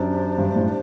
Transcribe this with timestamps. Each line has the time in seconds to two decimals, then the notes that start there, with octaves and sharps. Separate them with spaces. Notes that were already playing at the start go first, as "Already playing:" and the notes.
Already playing: F#2 D4 G4 C5
0.38 G2
0.56 A2